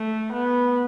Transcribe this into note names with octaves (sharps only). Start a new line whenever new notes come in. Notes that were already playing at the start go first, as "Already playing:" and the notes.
Already playing: A3
B3